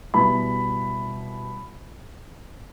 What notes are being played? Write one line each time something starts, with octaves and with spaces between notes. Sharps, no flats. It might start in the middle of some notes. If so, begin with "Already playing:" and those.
B2 G3 B3 E4 B5